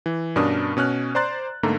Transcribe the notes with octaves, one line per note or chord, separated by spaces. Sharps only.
E3
G2 B2 C#4 D4 A#4 D#6
B2 C#4 F6 F#6
C5 D5 A#5 C6 F#6 A6
G#2 D3 A3 A#3 A4 A#5